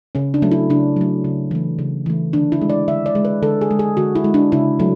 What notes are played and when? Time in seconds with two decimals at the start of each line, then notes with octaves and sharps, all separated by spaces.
0.15 C#3 C#4
0.34 D4
0.42 F#3 A3
0.51 E4
0.70 C#3 D4
0.96 F#3 A3
1.24 C#3
1.51 E3 A3
1.79 C#3
2.06 E3 A3
2.33 D3 D4
2.52 E4
2.61 G#3
2.70 D5
2.88 D3 E5
3.06 D5
3.15 G#3
3.25 B4
3.42 D3 A4
3.61 G#4
3.71 G#3
3.79 G#4
3.97 D3 F#4
4.15 E4
4.24 G#3
4.34 D4
4.52 C#3 E4
4.80 F#3 A3